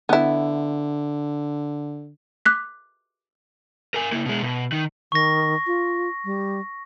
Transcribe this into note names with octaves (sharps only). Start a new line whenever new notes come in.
D3 B3 E4
D6 F#6 B6
A#4 G#5
A#3 E4
B2 G#3
B2
D#3
D#3 C#6 A#6
F4
G3